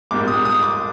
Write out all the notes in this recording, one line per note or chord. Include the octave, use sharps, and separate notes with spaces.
A#1 G#2 G3 A#3 D6
D#6
D#6
D6